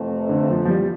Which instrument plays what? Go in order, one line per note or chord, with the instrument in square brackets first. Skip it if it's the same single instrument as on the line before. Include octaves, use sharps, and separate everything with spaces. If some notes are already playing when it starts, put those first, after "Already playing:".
Already playing: [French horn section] F2 C3 E3 A3 C4
[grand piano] D3
F3
F3
G3